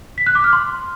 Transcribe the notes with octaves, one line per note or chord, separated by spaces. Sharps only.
B6
F#6
D6
F6
C6